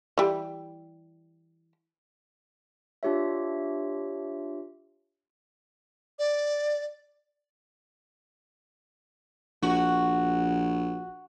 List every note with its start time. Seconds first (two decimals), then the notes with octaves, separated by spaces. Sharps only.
0.18 E3 G3
3.03 D4 F4 G4 C#5 E5
6.19 D5
9.62 A#1 F#4